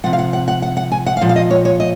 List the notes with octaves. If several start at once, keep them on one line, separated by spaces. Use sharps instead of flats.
C3 F3 F#5
F5
F#5
F#5
F#5
F#5
F#5
G#5
F#5
F5
A#2 F3 F#5
F5
D#5
C#5
C#5
D#5